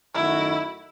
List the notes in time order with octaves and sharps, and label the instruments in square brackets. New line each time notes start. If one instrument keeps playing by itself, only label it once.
[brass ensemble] F#2 D#3 A3 D#4 F#4 [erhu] E4